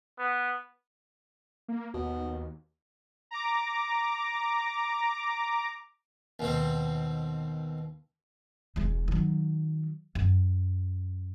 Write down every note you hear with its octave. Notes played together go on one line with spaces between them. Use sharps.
B3
A#3
D#2 B2
A#5 D6
D#2 B2 C4
E1 G#3
D#3 F#3
F#2